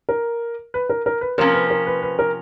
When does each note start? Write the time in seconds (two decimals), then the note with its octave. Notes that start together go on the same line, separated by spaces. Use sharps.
0.09 A#4
0.74 B4
0.90 A#4
1.06 A#4
1.21 B4
1.38 C3 F3 A#3 C#4 A#4
1.54 B4
1.70 A#4
1.87 B4
2.02 B4
2.19 A#4